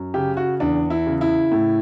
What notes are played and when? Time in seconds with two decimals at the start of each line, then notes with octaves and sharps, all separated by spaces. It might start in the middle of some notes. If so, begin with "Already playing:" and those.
Already playing: F#2
0.14 C#3 G4
0.37 F#4
0.60 E2 D4
0.90 E4
1.07 C#3
1.21 E4
1.52 A2